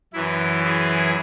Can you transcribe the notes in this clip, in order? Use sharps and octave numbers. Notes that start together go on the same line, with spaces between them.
F#2 E3 E4
E4 G#4